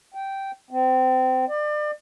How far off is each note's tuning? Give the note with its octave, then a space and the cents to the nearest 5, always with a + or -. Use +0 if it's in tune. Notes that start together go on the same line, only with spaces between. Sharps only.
G5 -10
C4 -25
D5 +35